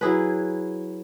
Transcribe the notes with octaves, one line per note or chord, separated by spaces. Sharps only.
F#3 E4 G#4 B4